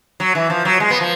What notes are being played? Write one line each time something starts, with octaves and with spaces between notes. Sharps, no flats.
F#3
E3
F3
F#3
G#3
B3
F3